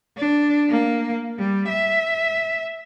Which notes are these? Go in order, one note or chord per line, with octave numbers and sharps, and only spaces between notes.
D4
A#3
G3
E5